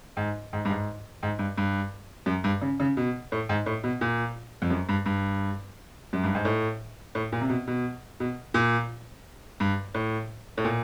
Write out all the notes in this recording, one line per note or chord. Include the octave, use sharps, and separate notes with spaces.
G#2
G#2
G2
G#2
G#2
G2
G2
F#2
G2
C#3
C#3
B2
A2
G#2
A2
B2
A#2
F2
F#2
G2
G2
F#2
G2
G#2
A2
A2
A#2
C3
B2
B2
B2
A#2
G2
A2
A2
A#2